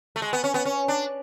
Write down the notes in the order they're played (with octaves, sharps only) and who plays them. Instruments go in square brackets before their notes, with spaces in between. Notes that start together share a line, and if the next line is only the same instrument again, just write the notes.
[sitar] A3
G#3
B3
C#4
B3
C#4
D4